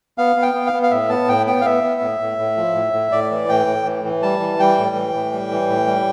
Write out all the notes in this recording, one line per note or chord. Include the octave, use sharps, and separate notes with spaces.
B3 F5
B3
G5
B3
F5
B3
F5
A2 E5
B3 A5
A2 G5
B3 G5
F5
B3 E5
B3
A2
A2
A2
F3
A2
A2
A2 D5
E3
A2 G5
A2
E3
E3
G3 A5
E3
G3 G5
A2
E3
A2
G3
E3
A2
G3